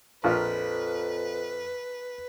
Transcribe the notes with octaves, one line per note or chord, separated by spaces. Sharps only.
A#1 F2 F4 A#4 B4